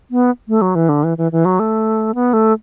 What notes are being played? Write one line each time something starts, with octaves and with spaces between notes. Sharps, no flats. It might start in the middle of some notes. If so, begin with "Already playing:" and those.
B3
A3
F#3
E3
D3
E3
E3
E3
F#3
A3
B3
A3